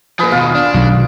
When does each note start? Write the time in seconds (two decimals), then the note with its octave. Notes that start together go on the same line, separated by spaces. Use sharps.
0.19 F3 A#3 G#4 B4
0.32 D#2 B2 F4
0.55 D4
0.74 B1 D#3 F#3